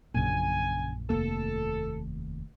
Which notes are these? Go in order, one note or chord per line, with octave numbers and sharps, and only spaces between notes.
A#1 F#2 A#2 C#3 G#5
F1 D#2 A#3 A4